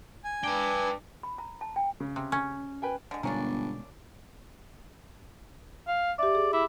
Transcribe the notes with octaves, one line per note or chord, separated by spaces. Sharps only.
G#5
D4 B4 G5
B5
A#5
A5
G5
C#3
C3
C#4
B4 G5 G#5
D3 G#3
G1 B2 G#3 A#3 C#4 D4
F5
G4 D5 E5
G#4
E4 B5 D6